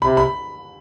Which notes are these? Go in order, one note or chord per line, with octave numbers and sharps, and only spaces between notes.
C3 B5
B5